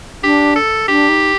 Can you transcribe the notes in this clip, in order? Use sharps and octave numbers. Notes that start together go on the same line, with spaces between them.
D4 G4
A4
D4 G4
D#4